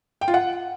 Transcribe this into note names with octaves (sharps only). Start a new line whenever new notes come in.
G5
F4
F#5